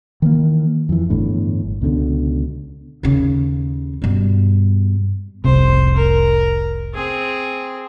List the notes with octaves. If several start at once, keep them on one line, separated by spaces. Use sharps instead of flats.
D#3 E3 A3 A#3
F2 E3
G1 E2 A2 D3
C#2 B2 D3
D#2 C#3
G2 B2
F1 C2 C3 C5
A#4
C4 G#4